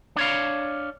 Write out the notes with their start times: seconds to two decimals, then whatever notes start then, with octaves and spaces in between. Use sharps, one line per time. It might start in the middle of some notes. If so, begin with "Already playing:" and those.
0.16 D4 C#5 F5